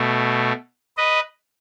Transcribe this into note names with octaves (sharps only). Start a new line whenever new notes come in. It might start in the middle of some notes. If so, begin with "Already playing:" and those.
Already playing: B2 A3
B4 D#5